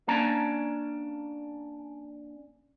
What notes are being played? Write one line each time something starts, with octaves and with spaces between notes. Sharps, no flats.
A#3 C#4 D4 A5 A#5